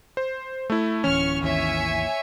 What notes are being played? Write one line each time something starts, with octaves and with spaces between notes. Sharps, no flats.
C5
A3 E4
D1 E3 C#4 C#6 F6
G#1 D#2 E3 C#5 E5 G#5